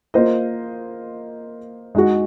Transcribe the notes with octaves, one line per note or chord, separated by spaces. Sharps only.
A#3 F4 C5 D#5
G#3 D#4 F#4